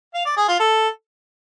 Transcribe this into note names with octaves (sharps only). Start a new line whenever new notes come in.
F5
D5
G#4
F4
A4